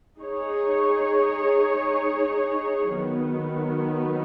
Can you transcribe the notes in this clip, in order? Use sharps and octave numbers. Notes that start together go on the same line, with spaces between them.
D#4 G#4 C#5
D#3 F#3 B3